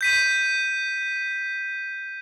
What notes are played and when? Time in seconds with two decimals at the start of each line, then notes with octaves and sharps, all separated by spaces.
0.01 G6 B6 D#7